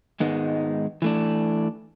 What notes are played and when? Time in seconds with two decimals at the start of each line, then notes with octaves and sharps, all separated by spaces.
0.20 G#2 D#3 G#3 B3 D#4
1.02 E3 A3 D4